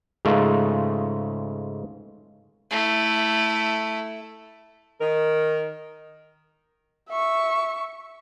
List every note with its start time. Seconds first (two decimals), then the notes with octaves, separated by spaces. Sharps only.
0.25 G#2 C#3 G#3 A3 F4
2.71 A3 E4
5.01 D#3 A#4
7.09 E5 C#6